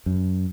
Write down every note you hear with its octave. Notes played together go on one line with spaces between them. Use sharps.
F#2